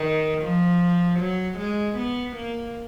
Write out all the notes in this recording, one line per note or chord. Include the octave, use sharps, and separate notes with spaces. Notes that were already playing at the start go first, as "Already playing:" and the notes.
Already playing: D#3
F3
F#3
G#3
B3
A#3